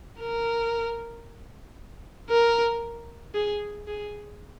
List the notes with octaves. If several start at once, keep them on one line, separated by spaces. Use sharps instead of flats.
A#4
A#4
G#4
G#4